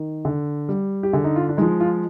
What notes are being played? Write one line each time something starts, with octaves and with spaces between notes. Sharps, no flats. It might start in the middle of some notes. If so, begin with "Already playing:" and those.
Already playing: D#3
D3
G3
G4
D3 G#4
D#4
F4
D4
F3 G#3 D#4
F4